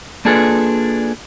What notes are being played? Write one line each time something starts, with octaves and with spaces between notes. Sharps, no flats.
A#3 D4 F4 G#4 A4 B4